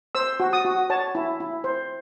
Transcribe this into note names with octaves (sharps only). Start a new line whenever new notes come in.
C5 E6
F#4
D#6
F#4
C#5 A5
E4
E4
C5